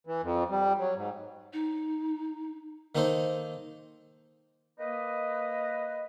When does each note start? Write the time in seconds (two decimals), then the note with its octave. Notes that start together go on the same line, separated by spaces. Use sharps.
0.07 E3
0.23 F2
0.50 G3
0.79 F#3
0.96 G#2
1.53 D#4
2.95 D#3 A#3 D#4 A4 C5
4.79 A#3 B4 D#5